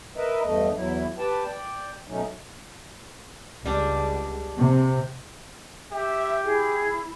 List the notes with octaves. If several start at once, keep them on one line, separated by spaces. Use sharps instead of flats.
A#4 B4 D#5 E5
E2 G2 A3 D#5
E2 F#3 E4
G4 B4 G5 A5
D5 G5
B2 F#3 A3 C#4 D#4
C#2 G3 D4
C3
G4 E5
E4 G#4